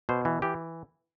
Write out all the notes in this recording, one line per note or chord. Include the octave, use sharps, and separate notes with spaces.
B2 C5
E3
E3 G4